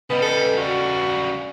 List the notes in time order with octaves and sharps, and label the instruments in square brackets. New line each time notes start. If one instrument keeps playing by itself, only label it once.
[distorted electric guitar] C#3 G3 [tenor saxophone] B3 [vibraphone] B4 D#5
[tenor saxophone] A4
[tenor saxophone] F#4 [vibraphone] D5